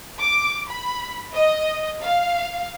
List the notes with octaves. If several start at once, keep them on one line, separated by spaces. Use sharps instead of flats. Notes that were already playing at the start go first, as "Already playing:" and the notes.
D6
B5
D#5
F5